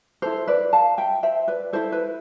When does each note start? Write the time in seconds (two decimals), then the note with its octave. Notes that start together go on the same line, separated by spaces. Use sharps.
0.22 E4 A4 C5
0.48 B4 D5
0.73 F5 A5
0.98 E5 G5
1.23 C5 E5
1.48 B4 D5
1.73 E4 A4 C5
1.92 B4